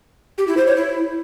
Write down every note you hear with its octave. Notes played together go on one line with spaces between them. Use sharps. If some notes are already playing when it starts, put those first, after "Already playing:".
G4
E4
C5
C#5
E4